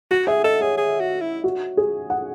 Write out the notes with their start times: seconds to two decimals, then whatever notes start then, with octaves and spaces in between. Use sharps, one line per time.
0.11 F#4 F#5
0.27 G#4 E5
0.44 A4 D#5
0.61 G#4 C#5
0.77 G#4
1.00 F#4
1.21 E4
1.44 F#4
1.77 G#4
2.10 F#5